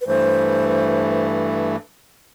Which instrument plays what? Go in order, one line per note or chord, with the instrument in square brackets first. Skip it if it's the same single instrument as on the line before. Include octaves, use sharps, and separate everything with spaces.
[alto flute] B4
[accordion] G2 E3 A3 [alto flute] C5